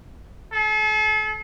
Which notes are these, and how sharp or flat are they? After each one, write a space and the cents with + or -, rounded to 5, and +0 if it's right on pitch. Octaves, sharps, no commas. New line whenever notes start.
A4 -45